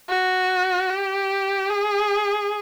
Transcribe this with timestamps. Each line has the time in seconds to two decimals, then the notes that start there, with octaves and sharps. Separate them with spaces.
0.09 F#4
0.90 G4
1.70 G#4